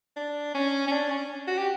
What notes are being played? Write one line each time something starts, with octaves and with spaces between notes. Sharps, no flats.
D4
C#4
C#4
D4
C#4
F#4
G4